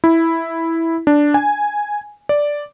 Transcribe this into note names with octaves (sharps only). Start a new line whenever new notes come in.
E4
D4
G#5
D5